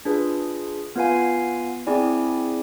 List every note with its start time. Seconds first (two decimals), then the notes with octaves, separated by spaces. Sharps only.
0.05 D4 F4 G#4 B4
0.96 B3 F4 B4 F5 G#5
1.87 C4 E4 G#4 D5 G#5